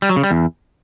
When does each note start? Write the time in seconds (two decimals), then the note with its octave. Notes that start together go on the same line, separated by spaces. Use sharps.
0.02 G3
0.09 F#3
0.16 C#3
0.24 G3
0.31 E2